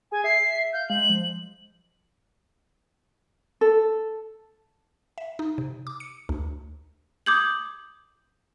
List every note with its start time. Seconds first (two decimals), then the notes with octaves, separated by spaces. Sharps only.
0.12 G#4 G#5
0.24 E5 C7
0.73 F5 G6
0.90 G#3 F#7
1.09 F3
3.61 A4
5.18 E5
5.39 D#4
5.58 C3
5.87 D6
6.00 C#7
6.29 D2
7.26 D6 D#6 G6 G#6 F#7